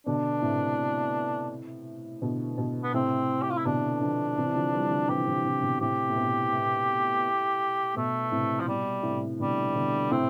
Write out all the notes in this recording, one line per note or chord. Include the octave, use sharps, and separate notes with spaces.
B2 D3 D4
A2 C3
B2 D3
B2
B3
A2 C3 C4
G4
F4
E4
B2 D3 D4
D3 F3
C3 E3
D3 F3
E3 G3
D3 F3
C3 E3 G4
C3 E3
C3 E3
B2 D3
A2 C3 G4
A2
B2
A2
B2 A3
A2 C3
F3
B2 G3
A2 C3
B2 D3 G3
B2 D3
A2 C3 C4